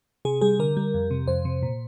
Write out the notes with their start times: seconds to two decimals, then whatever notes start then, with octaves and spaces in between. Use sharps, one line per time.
0.25 C3 G#4
0.41 G3 G#4
0.59 D3 A#4
0.77 G3
0.94 F2
1.11 C3
1.28 F2 C5
1.45 C3
1.63 A#2